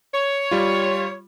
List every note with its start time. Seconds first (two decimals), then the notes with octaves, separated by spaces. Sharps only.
0.12 C#5
0.51 G3 F4